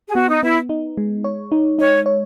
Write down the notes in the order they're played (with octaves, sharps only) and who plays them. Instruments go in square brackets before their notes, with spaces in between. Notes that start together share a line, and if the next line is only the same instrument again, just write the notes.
[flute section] G#4
[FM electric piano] B3 [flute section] F#4
[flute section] D#4
[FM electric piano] B3 [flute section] E4
[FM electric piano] D#4
G#3
C#5
D#4
[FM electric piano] D#4 [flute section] C#5
[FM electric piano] C#5